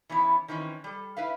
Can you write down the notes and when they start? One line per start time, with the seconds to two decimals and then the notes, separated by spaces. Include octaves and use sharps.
0.09 E3 B3 C#4 D#4 E4
0.48 D#3 E3 C4 C#4
0.84 G3 A4
1.17 E4 B4 E5 F5